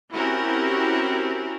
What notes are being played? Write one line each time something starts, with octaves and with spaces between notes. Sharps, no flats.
C4 C#4 E4 F#4 G4 A#4